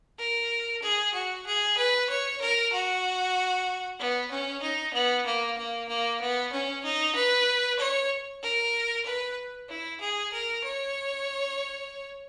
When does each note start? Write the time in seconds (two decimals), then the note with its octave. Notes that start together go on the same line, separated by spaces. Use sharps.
0.19 A#4
0.82 G#4
1.14 F#4
1.46 G#4
1.77 B4
2.09 C#5
2.41 A#4
2.72 F#4
3.99 B3
4.31 C#4
4.62 D#4
4.93 B3
5.26 A#3
5.58 A#3
5.88 A#3
6.21 B3
6.52 C#4
6.84 D#4
7.15 B4
7.79 C#5
8.43 A#4
9.05 B4
9.69 E4
10.00 G#4
10.32 A#4
10.64 C#5